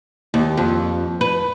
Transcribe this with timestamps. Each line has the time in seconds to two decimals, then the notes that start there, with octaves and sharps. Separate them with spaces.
0.34 D#2
0.57 F2
1.21 B4